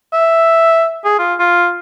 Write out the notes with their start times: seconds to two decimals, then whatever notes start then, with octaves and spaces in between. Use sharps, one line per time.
0.13 E5
1.05 G#4
1.19 F4
1.40 F4